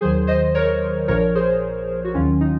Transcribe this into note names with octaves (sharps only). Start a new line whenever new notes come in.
D#2 D#3 F#3 G#4 C5
C5 D#5
A#4 C#5
A#1 A#2 F3 A#4 C#5
G#4 C5
F#4
D#2 D#3 F#3 C#4 F4
D#4